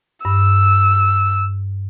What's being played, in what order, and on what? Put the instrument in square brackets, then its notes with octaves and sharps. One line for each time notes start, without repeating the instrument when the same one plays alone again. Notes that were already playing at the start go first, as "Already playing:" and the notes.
[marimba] G2 [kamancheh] E6